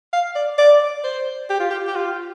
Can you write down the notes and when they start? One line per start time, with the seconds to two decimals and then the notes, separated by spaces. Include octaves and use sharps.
0.13 F5
0.35 D5
0.58 D5
1.04 C5
1.50 G4
1.60 F4
1.70 G4
1.87 G4
1.96 F4